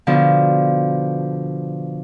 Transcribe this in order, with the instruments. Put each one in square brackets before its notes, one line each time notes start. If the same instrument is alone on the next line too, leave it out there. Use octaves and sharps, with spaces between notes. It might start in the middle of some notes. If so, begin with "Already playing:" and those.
[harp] B2 D3 F3